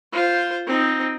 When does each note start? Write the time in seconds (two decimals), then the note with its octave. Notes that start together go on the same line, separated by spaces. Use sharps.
0.13 F4 C5
0.66 C4 D#4